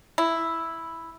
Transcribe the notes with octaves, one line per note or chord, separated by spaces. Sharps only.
E4